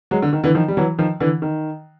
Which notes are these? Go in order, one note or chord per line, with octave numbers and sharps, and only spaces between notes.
F#3 G#3
D3
D#3
D3 E3
D#3 F3
G3
E3 F#3
D#3 F3
D3 E3
D#3